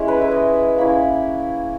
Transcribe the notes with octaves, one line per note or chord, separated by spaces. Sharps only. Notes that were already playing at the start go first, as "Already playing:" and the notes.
Already playing: G#3 C#4 E4
B4
E5
D#5
E5
A#3 C#4 E4 B5